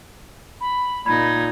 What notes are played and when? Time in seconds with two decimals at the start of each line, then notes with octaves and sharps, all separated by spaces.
0.61 B5
1.06 A#2 D#4 B5 G#6